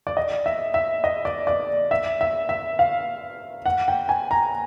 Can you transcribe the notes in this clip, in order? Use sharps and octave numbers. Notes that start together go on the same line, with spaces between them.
D5
D#5
E5
E5
D#5
D5
D5
E5
E5
E5
F5
F#5
G5
G#5
A#5